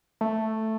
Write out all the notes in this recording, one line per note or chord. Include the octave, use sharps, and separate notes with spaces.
A3